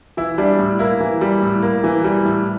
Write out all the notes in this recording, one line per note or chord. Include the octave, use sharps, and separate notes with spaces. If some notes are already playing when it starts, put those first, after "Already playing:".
E3 E4
G3 D4
A2
A#3 E4
E3
G3
A2
A#3
E3
G3
A2